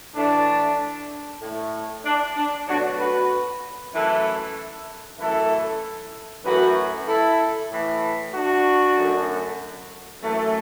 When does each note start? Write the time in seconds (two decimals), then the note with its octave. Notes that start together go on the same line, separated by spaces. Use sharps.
0.15 A2 E3 A3 D4
1.42 A2 A3
2.05 D4
2.36 D4
2.67 B2 F#3 A3 D4 F#4
2.99 F#4 B4
3.93 F#2 E3 A3 E4 A4
5.18 F#2 E3 A3 E4 A4
6.44 F#2 E3 A3 F#4 B4
7.07 E4 A4
7.70 A2 E3 A3
8.33 D4 F#4
8.96 F#2 D3 A3
10.21 F#2 E3 A3